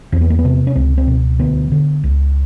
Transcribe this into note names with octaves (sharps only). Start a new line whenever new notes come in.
E2 C4
B3
A#3
B3
C3
C#4
C#2 C4
C4
B2
D2 B3
D3
C#2